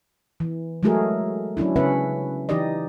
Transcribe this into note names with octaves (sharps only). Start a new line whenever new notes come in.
E3
F#3 G#3 A3 F#4 G#4 A#4
F#3 C#4 D4 E4
C#3 C#4 B4 E5 F#5
E3 D#4 G4 D5 D#5